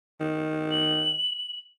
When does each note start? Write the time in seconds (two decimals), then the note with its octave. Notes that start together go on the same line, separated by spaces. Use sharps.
0.20 D#3
0.71 F#7